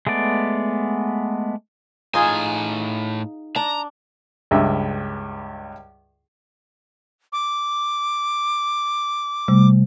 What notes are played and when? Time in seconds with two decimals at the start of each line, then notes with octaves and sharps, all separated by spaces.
0.07 G#3 A3 B3 D5
2.14 A2 D#4 F4 G#4 G#5
3.56 D4 A#5
4.51 C#2 G2 E5
7.33 D6
9.48 C3 G3 A3